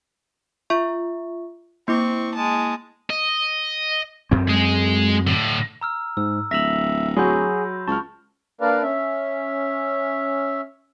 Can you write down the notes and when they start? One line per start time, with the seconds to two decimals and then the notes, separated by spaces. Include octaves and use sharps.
0.70 F4 E5 C#6
1.88 A#3 C4 E4 C#6 D6
2.34 G#3 A5
3.10 D#5
4.31 F#2 C4
4.49 G#3 G#4
5.27 A2 D3
5.81 A#5 E6 F6
6.17 G#2 E6
6.51 D1 E5 E6 A#6 F7 F#7
7.17 F#3 F#4 G#4 B5 C6 G6
7.88 C#2 A5 C#6 F6
8.61 A#3 D4 A#4 B4 D5 F5
8.82 C#4 E5